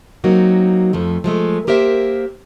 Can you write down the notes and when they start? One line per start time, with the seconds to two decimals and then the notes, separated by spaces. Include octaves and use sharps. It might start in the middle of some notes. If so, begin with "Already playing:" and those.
0.24 F#3 A#3 C4 D#4 F#4
0.93 F2 F3 A3
1.24 F3 G#3 A3
1.67 A#3 G4 A#4 C5 E5